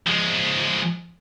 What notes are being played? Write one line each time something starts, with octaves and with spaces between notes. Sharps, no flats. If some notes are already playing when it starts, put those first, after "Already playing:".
F3 G#3